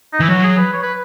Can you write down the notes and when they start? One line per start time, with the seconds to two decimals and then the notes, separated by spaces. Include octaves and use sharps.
0.13 D#4
0.20 E3 E4
0.29 F#3 F#4
0.44 G#4
0.58 B4
0.73 C#5
0.83 B4